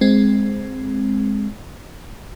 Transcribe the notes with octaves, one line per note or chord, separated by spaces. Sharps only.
G#3 C4